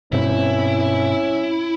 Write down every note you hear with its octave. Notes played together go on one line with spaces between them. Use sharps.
G2 B2 C4 C#4 E4